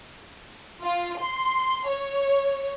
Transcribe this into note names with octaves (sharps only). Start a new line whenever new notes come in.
F4
C6
C#5